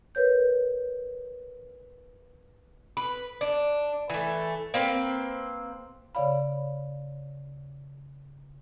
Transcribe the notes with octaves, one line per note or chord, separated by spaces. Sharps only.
A#4 B4 C#5 G6
B4
D4
E3 A3
A#3 C4 B4
C#3 C#5 D5 F5 B5